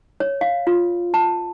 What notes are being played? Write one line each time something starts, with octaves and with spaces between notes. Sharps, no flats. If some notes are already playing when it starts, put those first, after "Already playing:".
C#5
F5
F4
A5